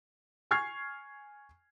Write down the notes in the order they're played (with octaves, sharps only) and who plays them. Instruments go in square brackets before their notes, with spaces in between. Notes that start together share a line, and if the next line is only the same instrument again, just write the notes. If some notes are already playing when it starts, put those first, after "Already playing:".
[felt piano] G#5 C#6 F6 G#6 C7